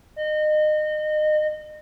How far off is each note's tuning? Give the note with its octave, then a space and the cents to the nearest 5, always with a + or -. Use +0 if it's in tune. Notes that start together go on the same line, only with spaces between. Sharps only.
D#5 -30